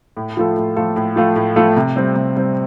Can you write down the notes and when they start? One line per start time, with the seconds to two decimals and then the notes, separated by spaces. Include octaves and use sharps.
0.17 A2
0.37 F3 A3 F4 A4
0.57 A2
0.76 F3 A3 F4 A4
0.96 A2
1.16 F3 A3 F4 A4
1.36 A2
1.56 F3 A3 F4 A4
1.76 C3
1.96 G3 C4
2.16 C3
2.36 G3 C4